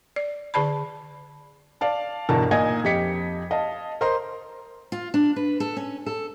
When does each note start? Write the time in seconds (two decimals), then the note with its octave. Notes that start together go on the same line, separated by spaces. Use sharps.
0.16 D5
0.54 D3 G#4 D5 A5 B5
1.81 D5 F5 A5
2.29 G1 E2 B2 A#4 A5
2.51 A#2 D#4 D#5 G#5 G#6
2.84 F2 G4 D#5 B6 C#7
3.51 D#5 F5 A5
4.01 A#4 C5 D#5 A#5 C6
4.92 F4
5.14 D4
5.36 B4
5.60 A4
5.77 C#4
6.06 A4